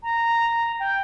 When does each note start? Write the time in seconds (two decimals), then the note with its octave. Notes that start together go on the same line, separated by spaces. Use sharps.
0.03 A#5
0.80 G5